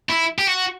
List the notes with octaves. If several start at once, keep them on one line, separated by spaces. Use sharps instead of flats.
E4
G4
F#4